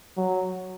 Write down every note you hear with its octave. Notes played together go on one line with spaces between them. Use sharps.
F#3